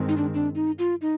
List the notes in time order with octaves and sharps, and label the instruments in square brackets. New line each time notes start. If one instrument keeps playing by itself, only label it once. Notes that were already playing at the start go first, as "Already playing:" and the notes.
Already playing: [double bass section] G2 D#3 G#3 C4
[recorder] D#4
D4
D4
D#4
F4
D#4